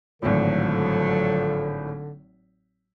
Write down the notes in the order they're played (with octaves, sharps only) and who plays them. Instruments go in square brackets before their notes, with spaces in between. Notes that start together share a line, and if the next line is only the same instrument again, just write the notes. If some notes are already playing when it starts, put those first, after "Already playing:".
[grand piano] G#1 A2 [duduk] D3 [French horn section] F3 A4 [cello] F#3